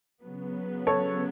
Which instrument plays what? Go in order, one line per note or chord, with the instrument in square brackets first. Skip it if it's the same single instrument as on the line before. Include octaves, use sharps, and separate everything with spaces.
[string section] C#3 F#3 B3
[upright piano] A4 C#5